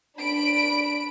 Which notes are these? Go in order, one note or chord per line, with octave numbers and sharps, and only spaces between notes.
D4 B5 D7